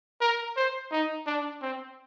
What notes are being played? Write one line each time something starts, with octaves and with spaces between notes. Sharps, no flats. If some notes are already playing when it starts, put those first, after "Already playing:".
A#4
C5
D#4
D4
C4